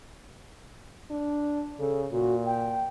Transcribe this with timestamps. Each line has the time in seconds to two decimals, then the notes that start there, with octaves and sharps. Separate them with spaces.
1.10 D4
1.79 C#3 A4
2.12 A#2 F#4
2.46 G5